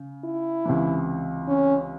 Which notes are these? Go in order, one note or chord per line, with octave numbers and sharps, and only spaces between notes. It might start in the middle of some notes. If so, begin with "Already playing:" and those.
Already playing: C#3
E4
C#2 C3 E3
C#4